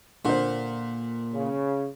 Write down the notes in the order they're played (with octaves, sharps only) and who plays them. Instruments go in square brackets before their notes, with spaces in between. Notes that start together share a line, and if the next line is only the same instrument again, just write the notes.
[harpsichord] A#2 [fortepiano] D3 C5
[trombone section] C#3